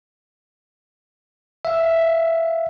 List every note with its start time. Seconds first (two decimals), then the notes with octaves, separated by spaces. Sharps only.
1.65 E5 F5